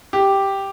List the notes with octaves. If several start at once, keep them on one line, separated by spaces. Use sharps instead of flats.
G4